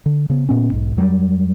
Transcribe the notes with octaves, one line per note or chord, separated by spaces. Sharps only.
D3
C#3 B3
A#2 B3 C#4
B1 G#2
F2 F#3 G3